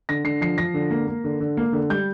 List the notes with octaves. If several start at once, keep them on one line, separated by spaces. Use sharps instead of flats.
D3 A#6
D3 C7
F3 C7
F3 A#6
D3
A#3
A#3
D3
D3
A#3
D3
G3 G6